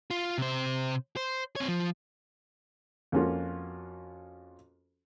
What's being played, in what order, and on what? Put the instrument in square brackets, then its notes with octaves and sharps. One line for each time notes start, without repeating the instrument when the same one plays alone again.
[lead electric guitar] F4
C3 C5
C5
C4 C#5
F3
[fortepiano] F2 A#3 C#4 F4 F#4